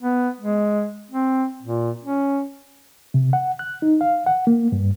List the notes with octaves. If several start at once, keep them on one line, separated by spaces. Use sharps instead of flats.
B3
G#3
C4
A#2
C#4
C3
F#5
F#6
D#4
F5
F#5
A#3
G2